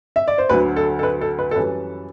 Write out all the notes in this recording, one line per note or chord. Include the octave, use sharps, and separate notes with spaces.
E5
D5
C5
D2 D3 F#3 B4
A4
A4
B4
A4
B4
A4
F#2 E3 G3 B4